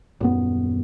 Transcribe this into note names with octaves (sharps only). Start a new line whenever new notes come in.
D#1 F#2 B3